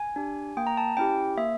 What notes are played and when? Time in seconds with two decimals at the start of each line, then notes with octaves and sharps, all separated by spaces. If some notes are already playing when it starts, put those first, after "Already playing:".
Already playing: G#5
0.16 D4 G4
0.57 A#3 G5
0.67 A#5
0.77 A5
0.97 C#4 E4 G4 G5
1.38 A#3 E5